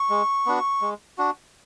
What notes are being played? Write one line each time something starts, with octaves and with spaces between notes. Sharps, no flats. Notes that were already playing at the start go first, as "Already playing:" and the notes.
Already playing: C#6
G#3
B3 D4 F#4
G#3
D4 F#4